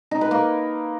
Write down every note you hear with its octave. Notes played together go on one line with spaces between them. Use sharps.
D#4
B4
A#3